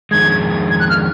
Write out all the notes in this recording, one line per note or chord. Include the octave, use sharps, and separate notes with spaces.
F2 D#3 G#3 G#6
G#6
F#6
F6